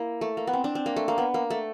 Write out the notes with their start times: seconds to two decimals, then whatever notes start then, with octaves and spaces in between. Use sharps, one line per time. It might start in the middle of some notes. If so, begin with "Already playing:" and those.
Already playing: A#3 E4
0.21 A3
0.37 A#3
0.47 B3
0.53 C4
0.64 D4
0.75 C4
0.86 A#3
0.96 A3
1.08 A#3
1.18 B3
1.34 A#3
1.50 A3